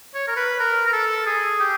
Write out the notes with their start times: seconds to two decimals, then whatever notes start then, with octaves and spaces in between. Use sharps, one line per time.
0.15 C#5
0.28 A#4
0.36 B4
0.60 A#4
0.86 A#4
0.93 A4
1.26 G#4
1.60 G4